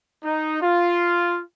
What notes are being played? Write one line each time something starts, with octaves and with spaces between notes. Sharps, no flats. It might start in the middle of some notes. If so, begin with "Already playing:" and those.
D#4
F4